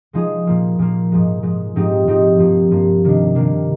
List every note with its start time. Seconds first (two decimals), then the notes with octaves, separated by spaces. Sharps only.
0.13 F3 G#3 D#4 G#4
0.47 A#2 F3 A#3
0.79 A#2 F3 A#3
1.12 G#2 F3 G#3
1.43 G#2 F3 G#3
1.76 G#2 F3 C4 D#4 G4
2.07 G#2 F3 C4 D#4 G4
2.38 G2 F3 A#3
2.71 G2 F3 A#3
3.04 C3 D#3 A#3 D4
3.35 C3 D#3 A#3 D4